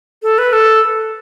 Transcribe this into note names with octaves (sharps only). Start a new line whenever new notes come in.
A4
B4
A4